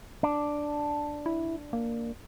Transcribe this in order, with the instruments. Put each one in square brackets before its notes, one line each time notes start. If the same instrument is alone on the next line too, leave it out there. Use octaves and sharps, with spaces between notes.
[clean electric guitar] D4
[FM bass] E4
A#3